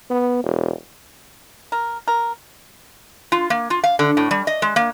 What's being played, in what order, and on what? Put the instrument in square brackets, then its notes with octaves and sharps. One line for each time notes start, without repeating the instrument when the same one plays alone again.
[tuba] B3
E1
[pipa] A#4
A#4
[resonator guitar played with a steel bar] F4
A#3
F4
F5
D3
A2
G3
D#5
G#3
A#3